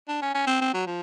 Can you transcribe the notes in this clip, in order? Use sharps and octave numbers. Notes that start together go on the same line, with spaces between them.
D4
C#4
C#4
C4
C4
F#3
F3